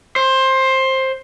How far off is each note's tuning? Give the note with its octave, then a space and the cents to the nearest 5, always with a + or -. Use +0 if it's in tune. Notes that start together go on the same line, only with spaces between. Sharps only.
C5 +15